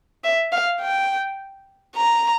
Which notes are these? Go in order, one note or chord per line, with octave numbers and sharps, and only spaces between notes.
E5
F5
G5
A#5